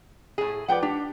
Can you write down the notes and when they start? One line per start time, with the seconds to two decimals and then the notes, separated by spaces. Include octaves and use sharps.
0.38 A2 G#4
0.68 F3 B4 D5 F#5 G5
0.83 D4 G4